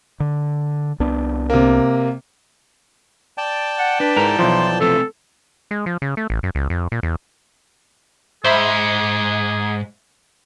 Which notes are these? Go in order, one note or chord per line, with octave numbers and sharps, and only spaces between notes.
D3
C2 B3 D4
C3 A#3
D5 G5 A5
F#5
D4 B4
G#2 E4 A#4 A#5
B1 E3 F3 F4
C3 A3 C4 A4
G#3
F3
C#3
A3
A1
F#2
C#2
F2
A#2
E2
G#2 G#4 C5 E5 B5